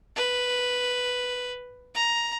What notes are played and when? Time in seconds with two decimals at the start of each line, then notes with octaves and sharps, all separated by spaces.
0.16 B4
1.95 A#5